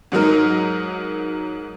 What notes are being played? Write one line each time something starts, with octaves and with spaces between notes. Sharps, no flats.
G#2 F#3 D#4 A#4